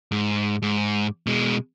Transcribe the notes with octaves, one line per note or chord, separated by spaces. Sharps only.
G#2
G#2
B2 G#3